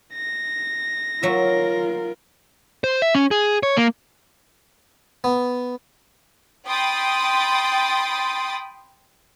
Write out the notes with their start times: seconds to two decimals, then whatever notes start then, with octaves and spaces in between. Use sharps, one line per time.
0.13 A#6
1.23 F#3 F4 A#4 E5
2.84 C5
3.02 E5
3.15 C#4
3.31 G#4
3.63 C#5
3.77 A#3
5.24 B3
6.67 G5 B5 C6 D#6 A6